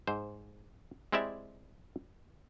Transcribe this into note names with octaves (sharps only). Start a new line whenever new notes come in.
G#2 C5
G#3 C4 E4 G4 D5 E5